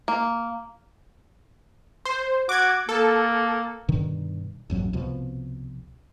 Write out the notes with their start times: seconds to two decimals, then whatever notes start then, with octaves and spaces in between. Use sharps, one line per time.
0.08 A#3
2.05 C5
2.49 F#4 D6 G#6
2.89 A#3 A4
3.88 G2 B2 D3 D#3
4.70 A1 F2 F#3
4.93 C2 B2 F3